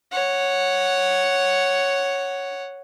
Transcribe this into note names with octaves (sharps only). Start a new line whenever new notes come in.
C#5 F#5